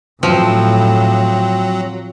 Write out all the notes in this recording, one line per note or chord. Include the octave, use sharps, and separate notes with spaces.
A2 F3 F#3 C4